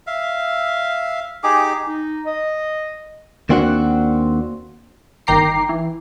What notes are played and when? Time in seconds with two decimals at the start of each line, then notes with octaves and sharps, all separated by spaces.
0.07 E5 F5
1.44 D#4 G4 G#4 D6
1.87 D#4
2.26 D#5
3.49 D#2 A#3 C4 D4 F#4 F#5
5.27 G1 D#3 G5 A#5 D6 C7
5.69 E3